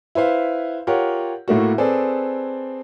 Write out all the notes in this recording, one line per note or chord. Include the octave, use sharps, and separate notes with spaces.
E4 B4 C5 F5
F4 G4 A#4 C#5 F#5
A2 A3 A#3 F#4
C4 G#4 A4 B4 D5